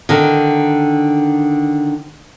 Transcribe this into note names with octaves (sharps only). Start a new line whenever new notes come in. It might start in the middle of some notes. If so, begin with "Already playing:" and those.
D3 D#3